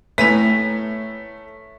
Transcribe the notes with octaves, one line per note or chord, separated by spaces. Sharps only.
A2 A3 B4 C#5 G#5 A#5 B6